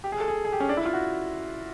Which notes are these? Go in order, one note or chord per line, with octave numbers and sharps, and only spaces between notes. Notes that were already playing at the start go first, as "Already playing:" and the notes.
G4
G#4
A4
G#4
G#4
G4
C#4
D4
E4
F4
F#4